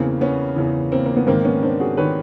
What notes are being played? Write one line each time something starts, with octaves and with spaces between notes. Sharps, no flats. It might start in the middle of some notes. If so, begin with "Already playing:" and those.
Already playing: E2 C#3 E3 A#3 C4
B3 C#4
E2 C#3 E3
A#3 C4
A#3
B3
G#2 D#3 A#3 C4
B3 C#4
C4 D4
F#4 G#4
D#3 B4 C#5